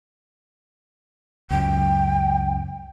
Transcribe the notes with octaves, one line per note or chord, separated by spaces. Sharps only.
C#2 F#2 G5